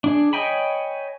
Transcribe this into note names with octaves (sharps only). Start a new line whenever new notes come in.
D4 G#4
C#5 D#5 G5 G#5 B5